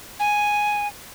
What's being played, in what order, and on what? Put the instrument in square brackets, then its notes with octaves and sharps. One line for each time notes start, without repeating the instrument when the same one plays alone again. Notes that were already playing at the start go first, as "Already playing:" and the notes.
[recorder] G#5